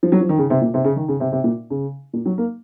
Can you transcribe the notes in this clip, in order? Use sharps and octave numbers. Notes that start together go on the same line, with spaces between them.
F3
F#3
F3
D#3
C#3
C3
A#2
C3
C#3
D#3
C#3
C3
C3
A#2
C#3
A#2
F#3
A#3